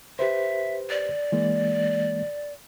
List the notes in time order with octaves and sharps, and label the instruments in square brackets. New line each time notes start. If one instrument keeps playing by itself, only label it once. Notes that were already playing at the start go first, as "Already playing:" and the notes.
[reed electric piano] G4 B4 C5 [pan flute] E5
[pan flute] D5
[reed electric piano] E3 G#3 A#3